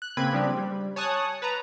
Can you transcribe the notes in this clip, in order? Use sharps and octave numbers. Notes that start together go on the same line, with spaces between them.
F#6
C#3 A#3 C4 B4 B5 G#6
C#3 F3 G3 C4 D4 G4
G3
C#5 G#5 A5 C#6 D#6 F#6
B4 A5 A#5